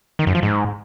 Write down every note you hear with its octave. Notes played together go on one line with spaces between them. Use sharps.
D#3
F#2
F3
G#2